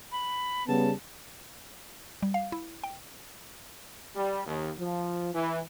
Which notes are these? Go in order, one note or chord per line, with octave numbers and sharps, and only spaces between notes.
B5
C#3 G3 B3 A5
G3
F5
E4
G5
G3
D#2
F3
E3